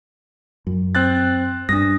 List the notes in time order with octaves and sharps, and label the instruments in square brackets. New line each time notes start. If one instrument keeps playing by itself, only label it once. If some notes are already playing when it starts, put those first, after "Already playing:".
[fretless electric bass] F#2
[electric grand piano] C4 F#6 A6
[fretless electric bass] G2 [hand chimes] D4 D#6 [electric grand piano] A#6